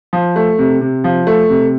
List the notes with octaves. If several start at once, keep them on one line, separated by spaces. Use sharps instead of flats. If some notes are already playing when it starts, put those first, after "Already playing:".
F3
A3
C3
C3
F3
A3
C3